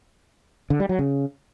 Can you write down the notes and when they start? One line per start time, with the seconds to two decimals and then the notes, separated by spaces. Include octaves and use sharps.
0.70 D3
0.80 G3
0.89 F#3
0.99 C#3